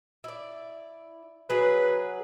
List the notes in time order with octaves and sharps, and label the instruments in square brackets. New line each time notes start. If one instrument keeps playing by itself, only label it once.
[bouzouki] E4 D5
[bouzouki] F#3 G#4 [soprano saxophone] B4